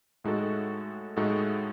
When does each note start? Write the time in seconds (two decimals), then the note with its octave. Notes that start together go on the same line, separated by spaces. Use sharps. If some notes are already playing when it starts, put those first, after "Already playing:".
0.24 A2 G#3 D#4 F#4 A4
1.17 A2 G#3 D#4 F#4 A4